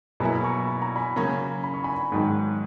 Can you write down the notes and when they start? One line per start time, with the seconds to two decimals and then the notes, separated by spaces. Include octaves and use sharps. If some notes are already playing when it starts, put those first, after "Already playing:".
0.20 B2 F#3 A#3 E4 G#5 B5
0.44 A#5 C#6
0.68 B5
0.82 A#5
0.96 G#5 B5
1.16 C#3 F#3 A#3 C#4
1.64 B5
1.74 C#6
1.84 G#5 B5
2.12 G#2 D#3 F#3